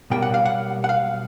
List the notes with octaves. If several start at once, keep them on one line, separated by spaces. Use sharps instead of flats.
B1 B2 G3 A#3 G5
F#5
F5
F#5
F#5
F5